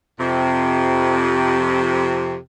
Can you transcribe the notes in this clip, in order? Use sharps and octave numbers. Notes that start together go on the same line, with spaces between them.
F2 C3